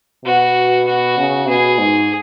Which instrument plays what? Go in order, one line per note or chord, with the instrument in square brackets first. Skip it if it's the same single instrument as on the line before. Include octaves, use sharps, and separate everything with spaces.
[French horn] B2 [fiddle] F#4
[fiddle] F#4
[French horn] C#3
[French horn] B2 [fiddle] G#4
[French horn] G#2